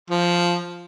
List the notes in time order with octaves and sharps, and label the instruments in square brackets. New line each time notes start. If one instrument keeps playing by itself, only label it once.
[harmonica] F3